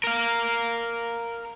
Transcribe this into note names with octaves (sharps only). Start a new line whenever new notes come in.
A#4 F5